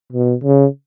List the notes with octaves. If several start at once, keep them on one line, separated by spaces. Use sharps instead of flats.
B2
C#3